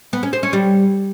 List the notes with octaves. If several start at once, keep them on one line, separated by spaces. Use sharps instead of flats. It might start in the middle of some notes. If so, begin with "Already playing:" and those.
B3
C#4
C5
C#4
G3